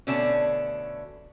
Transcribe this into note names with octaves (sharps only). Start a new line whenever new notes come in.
B2 D3 A3 C#4 D4 A5